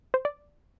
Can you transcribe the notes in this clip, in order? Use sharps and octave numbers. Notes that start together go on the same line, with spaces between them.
C5
D5